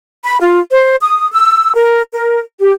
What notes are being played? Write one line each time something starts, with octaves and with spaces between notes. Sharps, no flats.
B5
F4
C5
D#6
E6
A#4
A#4
G4